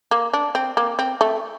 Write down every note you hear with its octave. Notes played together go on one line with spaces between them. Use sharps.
A#3
D4
C4
A#3
C4
A3